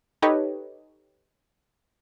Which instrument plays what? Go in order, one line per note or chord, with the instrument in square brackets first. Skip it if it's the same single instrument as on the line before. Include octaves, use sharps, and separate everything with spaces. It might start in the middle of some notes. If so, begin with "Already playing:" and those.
[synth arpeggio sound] D#4 G4 A4 B4 C#5 D#5